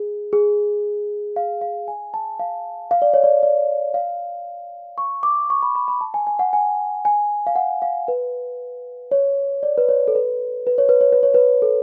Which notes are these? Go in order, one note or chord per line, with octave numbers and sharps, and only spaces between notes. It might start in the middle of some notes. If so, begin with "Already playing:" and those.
Already playing: G#4
G#4
F5
F5
G#5
A5
F5
F5
D5
C#5
D5
D5
F5
C#6
D6
C#6
B5
B5
B5
A5
G#5
G#5
F#5
G#5
G#5
F5
F#5
F5
B4
C#5
D5
B4
C#5
A4
B4
B4
C#5
B4
C#5
B4
C#5
B4
A4